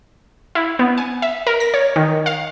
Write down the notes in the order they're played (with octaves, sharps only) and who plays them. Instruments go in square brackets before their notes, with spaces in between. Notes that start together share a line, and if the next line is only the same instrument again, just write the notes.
[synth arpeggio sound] E4
B3
G#5
E5
A#4
A#6
C#5
D#3
F5